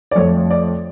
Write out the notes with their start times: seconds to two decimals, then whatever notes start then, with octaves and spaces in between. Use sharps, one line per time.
0.11 D5
0.15 F2 F3 A3 C#5
0.51 D5